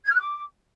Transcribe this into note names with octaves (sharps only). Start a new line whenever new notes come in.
G#6
F6
F#6
D6